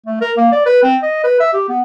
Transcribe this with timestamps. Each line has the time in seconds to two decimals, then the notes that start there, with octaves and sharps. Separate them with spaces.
0.06 A3
0.21 A#4
0.37 A#3
0.52 D5
0.66 B4
0.83 C4
1.03 D#5
1.24 B4
1.40 E5
1.53 G4
1.69 B3